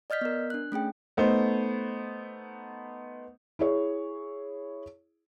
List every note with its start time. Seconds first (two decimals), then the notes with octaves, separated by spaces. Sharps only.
0.10 D5 D#5 F6 G6 B6
0.21 B3 A#4
0.50 D4 F#6
0.72 A3 C#4 G#4 G5
1.17 A3 B3 D#4 C5
3.59 E4 G#4 C#5